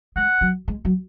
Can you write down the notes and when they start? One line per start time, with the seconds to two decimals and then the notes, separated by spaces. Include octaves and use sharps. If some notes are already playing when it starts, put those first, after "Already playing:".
0.16 G#3 F#5
0.41 F#3
0.68 G#3
0.85 F#3